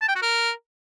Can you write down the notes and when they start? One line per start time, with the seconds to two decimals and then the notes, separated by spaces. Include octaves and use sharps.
0.02 A5
0.09 G5
0.15 F#4
0.22 A#4